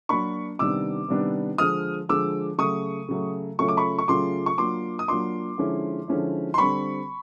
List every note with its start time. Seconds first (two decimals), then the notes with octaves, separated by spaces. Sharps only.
0.09 F#3 A#3 D4 B5 C#6
0.59 C3 D#3 G3 B3 D4 D6 E6
1.09 C3 D#3 G3 B3 D4
1.58 D3 F3 G#3 D#6 F6
2.09 D3 F3 G#3 D6 E6
2.58 C#3 F#3 A3 C#6 D#6
3.08 C#3 F#3 A3
3.59 C#3 F#3 A3 C#4 F4 C#6
3.68 D6
3.77 B5 C#6
3.99 C#6
4.08 C#3 F#3 A3 C#4 F4 C6 D6
4.46 C#6
4.58 F#3 A#3 D4 F4 C6 D6
4.99 D#6
5.08 F#3 A#3 D4 F4 C6 D6
5.58 D3 F3 G#3 C#4 E4
6.08 D3 F3 G#3 C#4 E4
6.54 C6
6.58 D3 G3 C4 B5 C#6